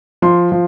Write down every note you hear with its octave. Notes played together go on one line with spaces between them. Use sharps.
F3 C6
F3